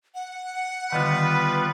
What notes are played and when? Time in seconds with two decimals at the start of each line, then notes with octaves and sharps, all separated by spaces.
0.15 F#5
0.92 D3 D#3 G3 B3 F4 B4